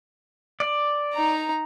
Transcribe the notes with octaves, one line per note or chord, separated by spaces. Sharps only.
D5
D#4 A#5